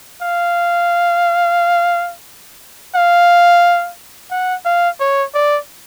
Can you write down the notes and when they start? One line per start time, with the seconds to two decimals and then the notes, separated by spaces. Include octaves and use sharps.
0.22 F5
2.95 F5
4.31 F#5
4.65 F5
5.00 C#5
5.34 D5